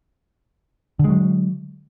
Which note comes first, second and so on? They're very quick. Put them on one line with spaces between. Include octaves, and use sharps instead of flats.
D3 G#3 F#3